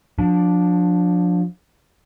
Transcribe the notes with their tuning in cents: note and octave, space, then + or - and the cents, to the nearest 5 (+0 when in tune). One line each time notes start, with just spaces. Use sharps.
F3 +30 D4 -5